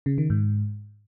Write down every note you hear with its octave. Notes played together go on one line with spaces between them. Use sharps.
C#3
D#3
G#2